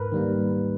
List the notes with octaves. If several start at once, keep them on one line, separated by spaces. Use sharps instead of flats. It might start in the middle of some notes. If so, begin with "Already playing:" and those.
Already playing: G#2 A#4 B4
D#3 G3 A#3